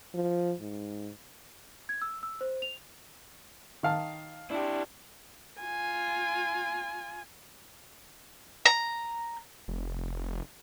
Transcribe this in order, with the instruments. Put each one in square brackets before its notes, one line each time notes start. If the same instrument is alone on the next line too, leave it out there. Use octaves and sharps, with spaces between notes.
[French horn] F3
G#2
[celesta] G#6
E6
E6
C5
F7
[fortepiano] D#3 F5 A5
[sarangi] D4 [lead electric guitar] E4 G4
[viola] F4 G#5
[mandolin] A#5
[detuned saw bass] F1